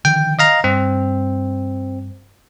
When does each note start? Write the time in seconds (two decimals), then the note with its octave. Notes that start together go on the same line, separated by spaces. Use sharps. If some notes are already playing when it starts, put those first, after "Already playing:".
0.05 D3 D#3 F3 G5
0.39 D#5 F5 A#5
0.64 G2 C4